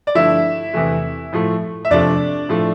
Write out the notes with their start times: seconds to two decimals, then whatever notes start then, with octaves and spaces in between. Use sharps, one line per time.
0.07 D5
0.15 G2 D3 F3 A3 E4 E5
0.74 E2 C3 E3 A3
1.33 A2 F3 A3
1.85 E5
1.90 F2 C3 F3 A3 D4 D5
2.49 A2 F3 A3